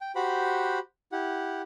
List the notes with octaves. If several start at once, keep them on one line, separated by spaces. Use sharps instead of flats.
G5
F#4 G4 C5 F#5 B5
E4 G4 F#5